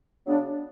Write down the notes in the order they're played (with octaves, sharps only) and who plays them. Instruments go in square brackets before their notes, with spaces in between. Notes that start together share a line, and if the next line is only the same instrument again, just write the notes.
[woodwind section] C#3 F#3 B3 D4